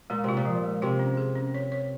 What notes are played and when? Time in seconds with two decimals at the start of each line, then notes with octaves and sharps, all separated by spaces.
0.10 A#2 G#3
0.24 C3 F4
0.37 A#2
0.45 F3
0.64 G#3
0.82 C3 F4
0.99 C#4
1.17 G#4
1.35 C#4
1.54 C#5
1.72 C#5